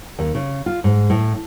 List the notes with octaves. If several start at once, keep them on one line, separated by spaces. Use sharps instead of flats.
D#2
C#3
F4
G#2
A2